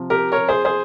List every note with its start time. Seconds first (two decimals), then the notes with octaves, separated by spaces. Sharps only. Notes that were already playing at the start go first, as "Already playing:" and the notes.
Already playing: C3 F3
0.10 G4 A#4
0.32 A#4 C#5
0.49 G#4 C5
0.65 G#4 C5